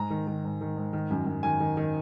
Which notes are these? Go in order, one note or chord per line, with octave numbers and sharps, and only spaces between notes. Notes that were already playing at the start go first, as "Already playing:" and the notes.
Already playing: G#2 A#5
D#3
D#3
G#2
D#3
G#2
D#3
F#2
F#2
D#3 G#5
D#3
D#3